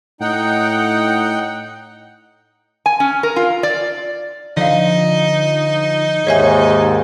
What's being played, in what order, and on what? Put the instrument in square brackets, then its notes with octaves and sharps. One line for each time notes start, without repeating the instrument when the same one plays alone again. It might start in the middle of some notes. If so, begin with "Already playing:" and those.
[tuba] A2 [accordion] D#4 F#5 G5
[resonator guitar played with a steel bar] G#5
C#4
A#4
F4
D5
[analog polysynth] D3 F3 [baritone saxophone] D#4 [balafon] D5 F5
[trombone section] D#2 G#2 [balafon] C#5 E5 G#5